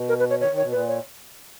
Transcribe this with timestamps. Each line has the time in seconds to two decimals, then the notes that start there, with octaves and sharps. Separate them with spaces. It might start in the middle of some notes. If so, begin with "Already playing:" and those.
Already playing: B2
0.09 A#4
0.19 B4
0.30 C#5
0.40 D#3 C#5
0.51 D#3
0.57 C#5
0.62 B2
0.72 A#2 B4
0.88 C#5